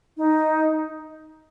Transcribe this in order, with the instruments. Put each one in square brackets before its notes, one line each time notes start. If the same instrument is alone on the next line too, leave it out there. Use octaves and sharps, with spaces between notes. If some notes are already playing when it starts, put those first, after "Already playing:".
[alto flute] D#4